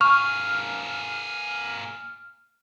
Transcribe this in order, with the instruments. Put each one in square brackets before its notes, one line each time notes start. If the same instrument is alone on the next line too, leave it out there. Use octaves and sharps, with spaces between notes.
[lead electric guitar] A#3 G#4 [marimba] C#6 [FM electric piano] F6